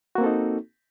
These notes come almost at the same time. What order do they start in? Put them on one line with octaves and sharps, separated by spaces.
F#4 A#3 C4 A4 D#4